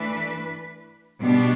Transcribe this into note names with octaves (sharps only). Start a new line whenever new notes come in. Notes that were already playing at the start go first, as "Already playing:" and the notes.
Already playing: E3 A3 D4 B4
B2 G3 B3 D4